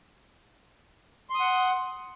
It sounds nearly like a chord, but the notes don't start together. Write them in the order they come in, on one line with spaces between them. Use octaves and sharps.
C6 D#6 F#5